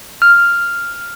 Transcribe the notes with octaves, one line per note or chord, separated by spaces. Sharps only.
F6